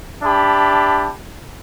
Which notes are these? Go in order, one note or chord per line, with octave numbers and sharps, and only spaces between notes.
D4 G4 E5 A5 B5